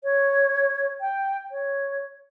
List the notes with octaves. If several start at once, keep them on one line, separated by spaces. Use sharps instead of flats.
C#5
G5
C#5